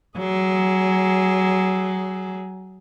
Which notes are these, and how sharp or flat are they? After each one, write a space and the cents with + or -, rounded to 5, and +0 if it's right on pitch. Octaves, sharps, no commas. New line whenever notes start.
F#3 +25 G#4 +5